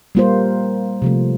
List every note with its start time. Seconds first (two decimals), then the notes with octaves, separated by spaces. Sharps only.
0.15 G3 A#3 F4 C5
1.02 C3 F3 A3